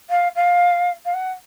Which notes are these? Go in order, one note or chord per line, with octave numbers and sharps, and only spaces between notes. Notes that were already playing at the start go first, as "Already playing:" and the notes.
F5
F5
F5
F#5